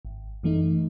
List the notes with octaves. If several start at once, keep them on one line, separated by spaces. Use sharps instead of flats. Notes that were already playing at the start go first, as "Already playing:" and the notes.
G#1
F#2 E3 A3 D#4